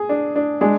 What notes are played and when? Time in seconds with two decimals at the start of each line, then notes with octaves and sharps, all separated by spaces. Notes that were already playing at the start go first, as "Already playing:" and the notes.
Already playing: G#4
0.09 D4
0.36 D4
0.61 G#3 D4